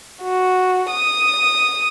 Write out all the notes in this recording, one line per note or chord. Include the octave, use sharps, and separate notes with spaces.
F#4
D#6